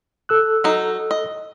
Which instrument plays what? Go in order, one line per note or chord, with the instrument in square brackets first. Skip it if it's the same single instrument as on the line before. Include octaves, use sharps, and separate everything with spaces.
[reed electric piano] A4 E6 F#6
[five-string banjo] F#3 D#4
D#5